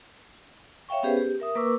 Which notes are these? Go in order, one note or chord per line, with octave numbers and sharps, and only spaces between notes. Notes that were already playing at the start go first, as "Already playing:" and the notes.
C#5 E5 F5 G5 C#6
B3 C#4 G4 G#4 B4 C5
G4
A#4 E5 D#6
A#3 A#4 B4 C#6 D6 E6